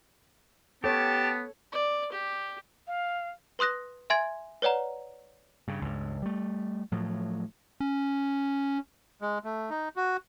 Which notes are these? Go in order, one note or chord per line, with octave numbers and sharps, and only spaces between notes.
B3 G4 A4 C#5 A5
D5
G4
F5
B4 C6 D#6 F#6 A#6
E5 G#5 C6 G#6 A6 D7
B4 C#5 D5 F#5 A#5
G2 C#3
C#2 G2
G3 A3
A2 F3 F#3
C#4
G#3
A3
D#4
F#4